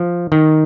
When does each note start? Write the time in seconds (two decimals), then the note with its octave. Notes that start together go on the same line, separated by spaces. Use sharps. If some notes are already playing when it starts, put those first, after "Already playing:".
Already playing: F3
0.32 D#3